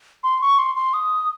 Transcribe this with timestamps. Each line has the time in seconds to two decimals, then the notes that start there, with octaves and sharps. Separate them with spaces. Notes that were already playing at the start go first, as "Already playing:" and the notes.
0.24 C6
0.42 C#6
0.59 C6
0.76 C6
0.94 D#6